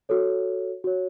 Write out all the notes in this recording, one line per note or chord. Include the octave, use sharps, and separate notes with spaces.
F#4 A4 C#5
F#4 C#5